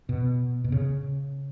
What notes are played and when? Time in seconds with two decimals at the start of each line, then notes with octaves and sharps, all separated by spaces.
0.09 B2
0.64 B2
0.72 C#3